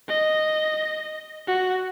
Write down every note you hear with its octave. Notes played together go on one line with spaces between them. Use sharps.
D#5
F#4